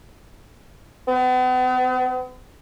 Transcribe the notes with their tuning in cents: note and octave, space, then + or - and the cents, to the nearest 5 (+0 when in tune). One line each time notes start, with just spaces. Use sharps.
B3 +40